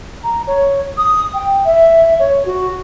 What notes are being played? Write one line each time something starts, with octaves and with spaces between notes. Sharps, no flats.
A#5
C#5
D#6
G5
E5
C#5
F#4